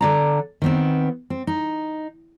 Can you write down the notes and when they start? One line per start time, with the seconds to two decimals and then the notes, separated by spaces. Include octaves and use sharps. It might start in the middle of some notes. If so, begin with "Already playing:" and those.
0.01 D3 D4 A#5
0.62 D#3 B3 C4
1.30 C4
1.47 D#4